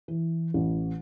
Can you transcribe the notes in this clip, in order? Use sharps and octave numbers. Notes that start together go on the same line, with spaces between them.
E3
A1